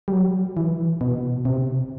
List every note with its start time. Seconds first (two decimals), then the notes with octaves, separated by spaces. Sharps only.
0.08 G3
0.13 F#3
0.57 E3
1.01 B2
1.45 C3